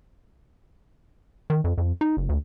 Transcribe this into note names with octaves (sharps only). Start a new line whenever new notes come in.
D#3
F2
F2
D#4
F#1
D2